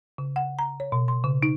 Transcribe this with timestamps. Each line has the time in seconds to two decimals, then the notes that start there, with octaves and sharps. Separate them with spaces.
0.18 C#3
0.36 F#5
0.59 A#5
0.80 C#5
0.92 B2
1.08 C6
1.24 C#3
1.43 D#4